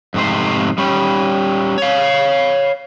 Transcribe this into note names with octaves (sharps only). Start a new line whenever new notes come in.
F2 G#2 C3 A3 C5
G3 C#4
C#5 F5